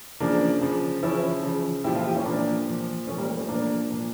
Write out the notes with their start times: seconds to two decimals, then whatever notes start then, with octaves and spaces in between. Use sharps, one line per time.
0.20 C#3 F3 A#3 D4
0.61 C#3 F3
1.03 C#3 F3 C#4 E4
1.43 C#3 F3
1.84 A#2 E4 G4
1.87 F3
1.95 F4 A4
2.05 E4 G4
2.15 C#4 E4
2.25 A#2 F3 A#3 D4
2.66 A#2 F3
3.07 A#2 A3 C#4
3.11 F3
3.18 G3 A#3
3.28 A3
3.38 A3 C#4
3.48 A#2 F3 A#3 D4
3.90 A#2 F3